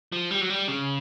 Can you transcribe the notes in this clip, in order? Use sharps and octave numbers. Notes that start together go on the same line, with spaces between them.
F3
G3
F#3
G3
C#3